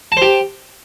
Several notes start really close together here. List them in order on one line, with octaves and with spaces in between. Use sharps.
A5 C5 G4